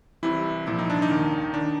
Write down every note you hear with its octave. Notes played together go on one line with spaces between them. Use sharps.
C2 C3 E3 E4
C2 A#2 F3 E4
D#4
D4
D#4
D#2 D#3
D#3 D4